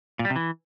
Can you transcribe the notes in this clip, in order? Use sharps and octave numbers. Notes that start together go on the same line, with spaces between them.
A#2
G3
C3
E3